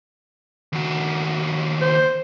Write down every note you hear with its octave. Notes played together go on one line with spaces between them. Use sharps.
D#2 F#4
C5